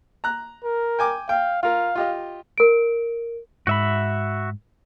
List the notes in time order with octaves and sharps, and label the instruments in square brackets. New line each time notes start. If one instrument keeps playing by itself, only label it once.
[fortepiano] A#5 F#6
[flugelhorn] A#4
[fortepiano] G5 G#5 D6
[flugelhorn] F5 [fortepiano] G5
[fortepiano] F4 A#4 [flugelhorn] F5
[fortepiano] F4 G4 D#5
[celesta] A#4 D7
[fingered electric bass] G#2 [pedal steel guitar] F#4 E5 B5